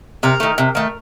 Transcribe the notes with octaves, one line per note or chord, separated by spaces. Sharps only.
C3 A#4
D#3 A3
C3
D#3 A3